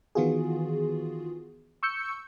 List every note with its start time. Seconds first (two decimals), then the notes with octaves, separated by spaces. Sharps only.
0.15 D#3 E3 B3 F4 F#4 G#4
1.83 C#6 E6 G6 C#7